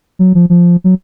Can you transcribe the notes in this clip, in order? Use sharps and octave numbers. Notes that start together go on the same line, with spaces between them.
F#3
F3
F3
F#3